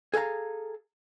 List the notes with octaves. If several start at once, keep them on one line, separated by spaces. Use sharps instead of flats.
G#4 A4 F5 F#5 A#5